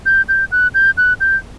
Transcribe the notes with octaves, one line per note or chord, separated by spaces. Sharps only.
G6
G6
F#6
G6
F#6
G6